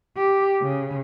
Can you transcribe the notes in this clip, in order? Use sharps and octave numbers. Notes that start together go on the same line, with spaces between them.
G4
C#3